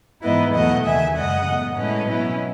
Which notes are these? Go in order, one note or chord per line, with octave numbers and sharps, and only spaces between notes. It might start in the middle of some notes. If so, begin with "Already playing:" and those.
G#2 E3 B3 E4 B4 D#5
E2 B2 F#3 A3 D#5 F#5
D#2 C#3 E3 E5 G#5
F#2 C#3 G#3 D#5 F#5
A2 F#3 B3
A2 G#3 C#4 E4 B4 D#5
B2 F#3 C#4 E4